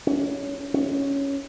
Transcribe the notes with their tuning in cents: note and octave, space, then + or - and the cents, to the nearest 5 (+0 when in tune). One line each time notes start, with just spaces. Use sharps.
C#4 +25
C#4 +5